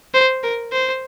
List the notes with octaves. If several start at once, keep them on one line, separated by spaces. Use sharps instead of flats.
C5
A#4
C5